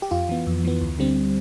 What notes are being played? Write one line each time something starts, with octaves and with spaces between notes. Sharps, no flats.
G4
F2 F4
E3 B3
F2
E3 B3
D2
D3 G3 C4